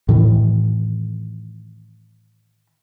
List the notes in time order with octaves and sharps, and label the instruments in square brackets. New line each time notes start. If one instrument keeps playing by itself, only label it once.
[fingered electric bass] A2 D#3 E3